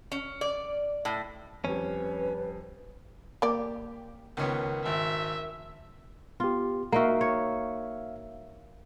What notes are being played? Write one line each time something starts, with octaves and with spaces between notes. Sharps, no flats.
C#4
D5
A2
F2 G3 C#4 B4
A#3 G4 D5
C#2 D#3 B3 C#4
G#1 E5
B3 F4 G4
A#3 D#4 F#4 E5 F5
C#5